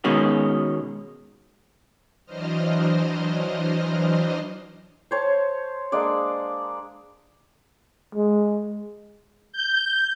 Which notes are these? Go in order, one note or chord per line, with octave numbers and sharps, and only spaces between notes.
B2 D#3 G#3 C#4 F#4
E3 F#3 D4 C5 D#5 F6
C5 C#5 A5
G#3 A#3 D4 D5
G#3
G6